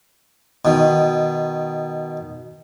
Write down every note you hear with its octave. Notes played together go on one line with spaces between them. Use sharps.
B2 D#3